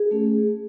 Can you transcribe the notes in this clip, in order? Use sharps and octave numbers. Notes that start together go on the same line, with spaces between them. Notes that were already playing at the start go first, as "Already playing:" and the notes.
Already playing: G#4
A3 C#4